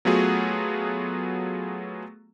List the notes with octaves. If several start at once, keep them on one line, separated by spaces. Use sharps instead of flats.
F#3 A3 B3 F4 F#4 G#4